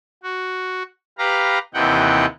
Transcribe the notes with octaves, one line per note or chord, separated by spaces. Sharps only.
F#4
G4 B4 F5 A#5
D#2 C3 E3 D#4 F#5 G5